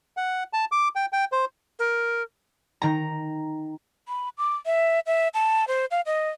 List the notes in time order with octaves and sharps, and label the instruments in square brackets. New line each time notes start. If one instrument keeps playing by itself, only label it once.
[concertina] F#5
A5
D6
G5
G5
C5
[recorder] A#4
[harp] D#3 A#5
[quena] B5
D6
E5
E5
A5
C5
F5
D#5